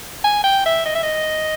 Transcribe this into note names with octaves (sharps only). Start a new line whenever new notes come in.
G#5
G5
E5
D#5
E5
D#5